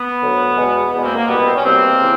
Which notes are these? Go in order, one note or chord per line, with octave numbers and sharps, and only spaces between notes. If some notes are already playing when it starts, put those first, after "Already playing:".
Already playing: B3
D2 D3 F#3
E2 B2 G#3
E2 B2 G#3 B3
A#3 C4
A#3
C2 B2 G3 B3
C4
C#4
C2 B2 G3 A#3 C4
C#3 E3